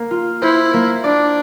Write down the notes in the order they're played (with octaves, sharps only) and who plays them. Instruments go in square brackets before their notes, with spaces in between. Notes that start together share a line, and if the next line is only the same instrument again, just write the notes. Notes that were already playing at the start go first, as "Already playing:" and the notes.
Already playing: [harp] A#3
F4
[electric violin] E4 [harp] C5
[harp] A#3
[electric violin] D4 [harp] D5